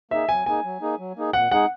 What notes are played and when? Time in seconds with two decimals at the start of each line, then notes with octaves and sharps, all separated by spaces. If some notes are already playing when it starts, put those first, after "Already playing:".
0.11 A#3 D#4 G#4 E5
0.29 F#3 G#5
0.46 A#3 D#4 G#4 G#5
0.64 F#3
0.81 A#3 D#4 G#4
0.99 F#3
1.17 A#3 D#4 G#4
1.33 A#2 F#5
1.51 G#3 D#4 G#4 F#5